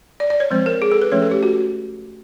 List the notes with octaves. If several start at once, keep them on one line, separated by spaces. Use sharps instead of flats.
D5
D5
C#5
F3 G#3 C4 C5
A#4
G#4
A4
B4
F3 A3 C#4 C#5
A4
G4
F#4